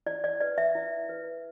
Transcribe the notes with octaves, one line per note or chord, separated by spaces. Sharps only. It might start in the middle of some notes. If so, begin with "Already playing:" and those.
E4 D5
D5
B4 D5
E5
E4
B4